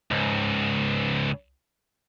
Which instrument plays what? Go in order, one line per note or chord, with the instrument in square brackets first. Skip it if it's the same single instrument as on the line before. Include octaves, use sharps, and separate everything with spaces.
[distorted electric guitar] C#2 G#2